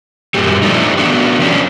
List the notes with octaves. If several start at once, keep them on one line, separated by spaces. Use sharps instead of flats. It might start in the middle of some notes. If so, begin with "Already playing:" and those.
F#2 A#2 F#3 G3
F3 A3 D4 D#4
B3 D4 F#4
F3 C#4 D4